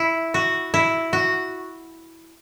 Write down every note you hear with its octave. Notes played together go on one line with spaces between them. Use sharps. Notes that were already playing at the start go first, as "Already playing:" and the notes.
Already playing: E4
F#4
E4
F#4